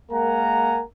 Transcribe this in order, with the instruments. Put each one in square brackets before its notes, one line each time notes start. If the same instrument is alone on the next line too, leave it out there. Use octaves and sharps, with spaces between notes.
[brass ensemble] G#3 A#3 A#4 F#5 G#5 A#5